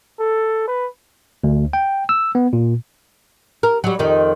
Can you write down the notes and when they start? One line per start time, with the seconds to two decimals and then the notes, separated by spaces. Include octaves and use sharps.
0.19 A4
0.67 B4
1.44 D2
1.73 G5
2.09 E6
2.35 B3
2.53 A#2
3.63 A#4
3.84 F#3 G3
3.99 F2 D#3